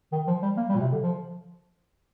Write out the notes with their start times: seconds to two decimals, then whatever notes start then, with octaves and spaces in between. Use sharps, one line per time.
0.12 D#3
0.27 F3
0.42 G3
0.57 A#3
0.69 G3
0.75 A#2
0.80 C3
0.92 D3
1.03 F3